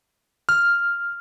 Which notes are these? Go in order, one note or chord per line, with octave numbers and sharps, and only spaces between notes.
F6